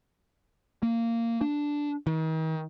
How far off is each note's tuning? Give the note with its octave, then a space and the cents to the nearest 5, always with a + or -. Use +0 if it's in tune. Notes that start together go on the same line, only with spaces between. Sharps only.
A#3 -15
D4 -5
D#3 +40